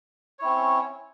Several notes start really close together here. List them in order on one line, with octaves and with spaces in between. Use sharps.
C#5 E4 C4 C#4